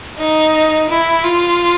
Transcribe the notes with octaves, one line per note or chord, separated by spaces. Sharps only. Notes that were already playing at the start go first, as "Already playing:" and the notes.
D#4
E4
F4